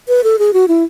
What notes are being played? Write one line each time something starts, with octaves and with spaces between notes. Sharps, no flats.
B4
A4
G#4
F#4
E4